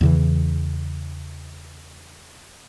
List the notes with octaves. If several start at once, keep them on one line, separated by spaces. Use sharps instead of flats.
E2 C#3 E3